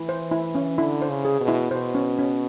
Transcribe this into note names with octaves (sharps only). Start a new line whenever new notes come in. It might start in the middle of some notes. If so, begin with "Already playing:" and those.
Already playing: E3 E4
C5
E4
C#4
D3 E4
C5
C#3
G#4
B2
E4
B2 C5
C#4
C#4